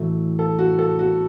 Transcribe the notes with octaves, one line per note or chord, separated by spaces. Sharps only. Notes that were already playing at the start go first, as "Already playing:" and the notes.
Already playing: A1 A2 F#3 A3 E4
A4
F#4
A4
F#4